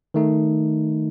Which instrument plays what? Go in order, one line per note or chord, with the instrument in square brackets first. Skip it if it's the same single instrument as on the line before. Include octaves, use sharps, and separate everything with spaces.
[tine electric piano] D#3 A3 D#4